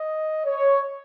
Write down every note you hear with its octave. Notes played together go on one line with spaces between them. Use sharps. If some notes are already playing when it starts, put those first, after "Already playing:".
Already playing: D#5
C#5